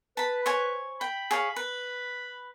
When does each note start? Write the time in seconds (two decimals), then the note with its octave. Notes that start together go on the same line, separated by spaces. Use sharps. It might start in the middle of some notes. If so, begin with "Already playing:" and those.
0.17 B4 A5 B5
0.46 C5 C#5 G#5
1.01 G5 B5
1.31 G#4 C#5 F5
1.56 B4